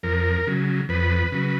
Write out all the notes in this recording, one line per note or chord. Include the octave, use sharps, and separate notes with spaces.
F2 A#4
C#3 F#3
F2 B4
C#3 F#3